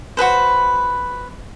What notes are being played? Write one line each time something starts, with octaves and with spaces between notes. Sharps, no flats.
F#4 G#4 B4 C5